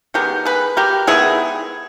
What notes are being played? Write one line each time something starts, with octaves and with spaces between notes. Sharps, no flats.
D#3 G#3 B3 G4 A#4
G#4 B4
G4 A#4
D#3 G#3 B3 E4 G#4